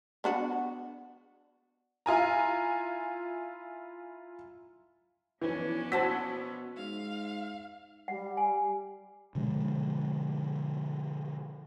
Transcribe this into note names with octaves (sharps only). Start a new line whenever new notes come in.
B3 D4 F#4
E4 F4 G#5 A#5
B1 E3 F3 C#4 D4
B2 F#4 C5 A5 E6 B6
G#2 F5
G3 F#5
G#5
B2 D3 F3 G#3